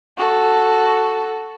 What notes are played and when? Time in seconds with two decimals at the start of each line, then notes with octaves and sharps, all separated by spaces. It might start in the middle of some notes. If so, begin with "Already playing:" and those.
0.18 F#4 A4